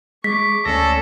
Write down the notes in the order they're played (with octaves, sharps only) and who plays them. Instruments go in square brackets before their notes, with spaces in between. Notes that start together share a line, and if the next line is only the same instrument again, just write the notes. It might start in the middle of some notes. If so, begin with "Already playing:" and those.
[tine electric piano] G#3 [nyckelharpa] C#6 D6 [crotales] B6
[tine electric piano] D2 A#6 [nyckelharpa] C#4 D5 [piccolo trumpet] A4